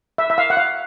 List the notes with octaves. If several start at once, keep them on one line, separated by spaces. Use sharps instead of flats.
E5
E5
F5
F#5
F5